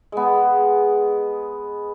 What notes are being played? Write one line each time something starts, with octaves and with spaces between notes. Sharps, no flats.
G#3 B3